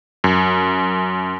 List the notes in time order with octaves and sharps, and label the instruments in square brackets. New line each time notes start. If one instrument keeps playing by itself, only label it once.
[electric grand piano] F#2